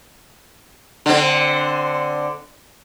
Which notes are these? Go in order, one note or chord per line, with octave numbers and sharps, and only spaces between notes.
D3 C4